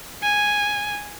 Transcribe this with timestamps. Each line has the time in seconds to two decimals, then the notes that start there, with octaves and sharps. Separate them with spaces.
0.23 G#5